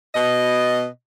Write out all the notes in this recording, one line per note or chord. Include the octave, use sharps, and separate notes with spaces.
B2 D#5